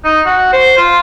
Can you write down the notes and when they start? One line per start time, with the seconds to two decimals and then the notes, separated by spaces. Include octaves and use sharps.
0.05 D#4
0.26 F#4
0.53 C5
0.77 F4